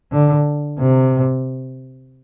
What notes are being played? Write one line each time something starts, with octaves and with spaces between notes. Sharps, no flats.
D3
C3